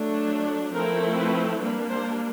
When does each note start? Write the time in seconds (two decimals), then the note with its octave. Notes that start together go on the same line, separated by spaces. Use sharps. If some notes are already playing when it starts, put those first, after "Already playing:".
Already playing: F#3 A3 D4
0.73 F3 A3 C4 E4 A#4
1.16 B4
1.60 G3 A#3 D4 B4
1.89 C5